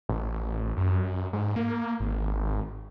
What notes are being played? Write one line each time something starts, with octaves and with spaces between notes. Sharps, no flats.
A1
F#2
G#2
A#3
G#1